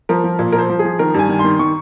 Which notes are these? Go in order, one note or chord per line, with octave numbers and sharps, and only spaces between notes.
F3 A#4
F3
A#2
F3 A#4
C5
F3
G#4
F3
D#3 A#4
G2 G#5
D#3
C6
D#3
D#3 C#6